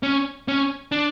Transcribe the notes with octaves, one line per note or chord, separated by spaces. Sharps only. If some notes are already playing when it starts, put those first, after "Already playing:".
C#4
C#4
D4